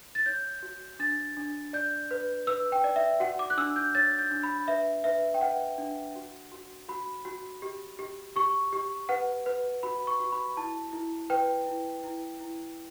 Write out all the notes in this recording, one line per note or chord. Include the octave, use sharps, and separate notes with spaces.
A6
C#5 G6
F#4
D4 A6
D4
D5 G6
B4
B4 E6
G5
D5
E5
F#4 F#5
D6
F#6
D4 E6
G6
C#5 A6
G6
D4
B5
B4 E5
B4 E5
G5
B4 F#5
D4
F#4
F#4
F#4 B5
F#4
G4
G4
G4 C#6
G4
B4 F#5
B4
F#4 B5
C#6
F#4
B5
E4 A5
E4
B4 G5
E4
E4
E4